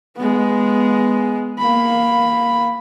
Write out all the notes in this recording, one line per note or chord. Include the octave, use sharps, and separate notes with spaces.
G#3 B3
A#3 B5